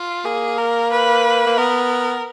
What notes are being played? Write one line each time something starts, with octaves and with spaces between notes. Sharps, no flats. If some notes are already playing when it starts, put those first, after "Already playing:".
Already playing: F4
A#3 G#4
A#4
B4
A#3
B3 A#4